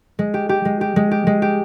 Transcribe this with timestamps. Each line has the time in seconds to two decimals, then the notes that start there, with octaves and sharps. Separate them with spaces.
0.19 G#3
0.34 G4
0.49 G4
0.65 G#3
0.81 G4
0.96 G#3
1.11 G4
1.27 G#3
1.42 G4